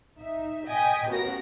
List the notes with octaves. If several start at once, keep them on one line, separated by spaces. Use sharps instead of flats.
D#4 E5
D#5 G5 G#5 D#6 B6
A1 B3 F#4 A#4 A#6